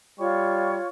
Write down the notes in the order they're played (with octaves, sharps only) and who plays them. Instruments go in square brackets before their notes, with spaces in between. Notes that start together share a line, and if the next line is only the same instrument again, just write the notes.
[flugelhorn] G3 [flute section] F4 C#5 C#6